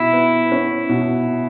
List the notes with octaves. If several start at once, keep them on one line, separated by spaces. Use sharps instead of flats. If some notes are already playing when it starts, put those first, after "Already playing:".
Already playing: B2 E4
B3
C#4
B2